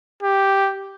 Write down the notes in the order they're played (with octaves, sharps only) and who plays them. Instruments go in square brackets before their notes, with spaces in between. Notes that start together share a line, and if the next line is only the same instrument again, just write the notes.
[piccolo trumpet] G4